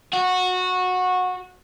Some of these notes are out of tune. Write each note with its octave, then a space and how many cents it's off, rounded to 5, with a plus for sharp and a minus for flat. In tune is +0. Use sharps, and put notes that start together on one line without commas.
F#4 -15